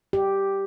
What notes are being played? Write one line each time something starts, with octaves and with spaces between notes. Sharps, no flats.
G4